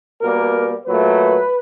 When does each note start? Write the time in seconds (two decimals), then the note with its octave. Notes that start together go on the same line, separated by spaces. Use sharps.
0.22 B2 G3 A#3 A#4
0.86 A#2 F#3 A3 B4